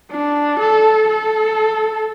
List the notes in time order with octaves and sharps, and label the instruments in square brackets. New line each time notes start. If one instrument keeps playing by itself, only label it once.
[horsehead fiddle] D4
A4
A4